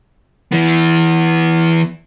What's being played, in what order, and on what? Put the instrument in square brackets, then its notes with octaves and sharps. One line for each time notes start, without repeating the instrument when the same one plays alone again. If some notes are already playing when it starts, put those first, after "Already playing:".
[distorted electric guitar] E3 B3